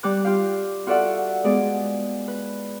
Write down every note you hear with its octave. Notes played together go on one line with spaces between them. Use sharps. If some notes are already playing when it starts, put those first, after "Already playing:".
G3 D6 F#6
F4 G4 F5
F4 F#4 A4 D5 E5 F#5
G#3 B3 G#4 D5
B4